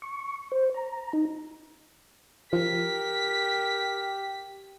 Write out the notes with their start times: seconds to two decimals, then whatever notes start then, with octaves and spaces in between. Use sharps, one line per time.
0.02 C#6
0.52 C5
0.74 A#5
1.13 D#4
2.53 F3 G4 A#4 B6